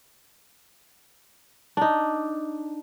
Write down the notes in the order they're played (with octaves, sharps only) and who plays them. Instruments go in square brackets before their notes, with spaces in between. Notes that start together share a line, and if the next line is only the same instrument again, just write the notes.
[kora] D4 D#4